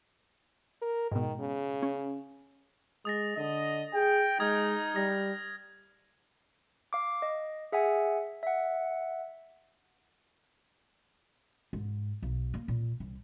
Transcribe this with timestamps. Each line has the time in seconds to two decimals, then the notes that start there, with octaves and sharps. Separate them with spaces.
0.82 A#4
1.11 G#2 B2 D#3
1.40 C#3
1.83 C#4
3.05 G#3 D#6 A6 A#6
3.37 D3 D#5
3.94 G#4 G5
4.40 G#3 D#4 D#6 F6 G#6
4.95 G3 D#6 A#6
6.93 F5 D6
7.22 D#5
7.72 G#4 E5 F#5 G#5
8.43 E5 F#5
11.73 G#2
12.22 B1
12.54 A#3
12.68 A#2
13.00 C2